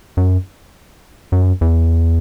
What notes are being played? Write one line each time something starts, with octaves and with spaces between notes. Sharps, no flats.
F#2
F#2
E2